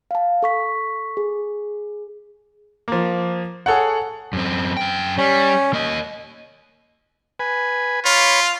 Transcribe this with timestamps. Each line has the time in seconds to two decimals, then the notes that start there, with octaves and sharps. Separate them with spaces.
0.11 F5 A5
0.43 A4 C#6 B6
1.17 G#4
2.88 F3 A#3
3.66 G#4 A4 C#5 F#5
4.33 F#2 C4
4.77 F#2 G5
5.18 G3 C#4
5.73 A#3 D#5
7.39 B4 G#5
8.05 F4 C#5 B5